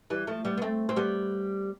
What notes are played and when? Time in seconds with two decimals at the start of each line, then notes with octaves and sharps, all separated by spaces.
0.10 E3 G3
0.27 F3 A3
0.45 G3 B3
0.58 B3
0.62 A3 C4
0.89 C4
0.96 G3 B3